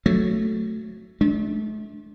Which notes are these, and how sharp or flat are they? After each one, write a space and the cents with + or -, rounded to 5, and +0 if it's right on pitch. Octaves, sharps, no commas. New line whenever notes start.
F#3 +0 A3 +0
A3 -45 D4 -5